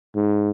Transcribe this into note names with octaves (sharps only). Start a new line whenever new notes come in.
G#2